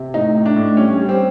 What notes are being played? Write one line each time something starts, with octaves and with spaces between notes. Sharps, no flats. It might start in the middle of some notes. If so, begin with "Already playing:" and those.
Already playing: C3
A2 D#4
A2
D4
A2
G3 C#4
G3
C4